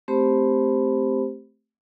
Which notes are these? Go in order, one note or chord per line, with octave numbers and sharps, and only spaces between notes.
A3 C4 G4 C5 B5